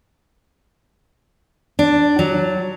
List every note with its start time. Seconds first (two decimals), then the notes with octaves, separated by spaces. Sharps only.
1.79 D4
2.19 F#3